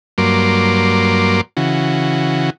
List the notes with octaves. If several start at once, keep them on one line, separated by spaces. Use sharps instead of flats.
G2 F#3 A#3 C6 D6
C#3 E3 F#4